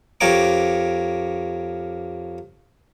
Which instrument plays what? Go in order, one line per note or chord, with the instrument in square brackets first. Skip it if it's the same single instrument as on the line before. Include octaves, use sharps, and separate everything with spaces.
[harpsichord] F2 A#3 G4 C#5 A#5 D6